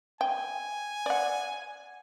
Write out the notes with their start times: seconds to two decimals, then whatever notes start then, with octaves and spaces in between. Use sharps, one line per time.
0.21 G5 G#5
1.06 D5 F#5